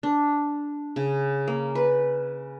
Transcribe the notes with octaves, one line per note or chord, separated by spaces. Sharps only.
D4
C#3
A#3
B4